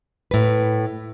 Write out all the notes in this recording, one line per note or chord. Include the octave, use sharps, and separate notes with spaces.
A2 B4